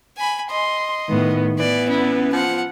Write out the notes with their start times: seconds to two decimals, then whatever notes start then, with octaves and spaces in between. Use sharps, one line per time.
0.18 G#5 B5
0.50 D#5 C6
1.09 A2 D#3 B3
1.59 E3 B3 D5
1.89 C#4 E4
2.33 F3 F#5